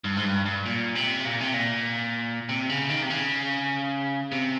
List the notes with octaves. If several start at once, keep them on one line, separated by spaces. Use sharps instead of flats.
G2
G#2
G2
G2
A#2
C3
A#2
C3
A#2
C3
C#3
D#3
C3
C#3
C3